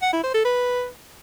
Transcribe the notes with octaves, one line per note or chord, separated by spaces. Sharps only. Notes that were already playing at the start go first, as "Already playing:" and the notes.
F#5
E4
C5
A4
B4